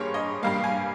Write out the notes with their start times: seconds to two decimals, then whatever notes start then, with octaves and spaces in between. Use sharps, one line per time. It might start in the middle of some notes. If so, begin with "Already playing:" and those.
Already playing: G2 G3 A#3 G#4 C5 C#5
0.14 D#5
0.43 G2 G3 A#3 F5
0.64 G#5